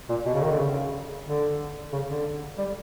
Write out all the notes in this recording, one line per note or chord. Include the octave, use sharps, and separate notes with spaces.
A#2
B2
C#3
D#3
D3
C#3
D3
C#3
D3
G3